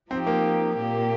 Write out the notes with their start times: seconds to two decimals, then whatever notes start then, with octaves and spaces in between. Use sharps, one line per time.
0.10 F3 C4 D#4 G4
0.27 A#3
0.77 A#2 A#3 G4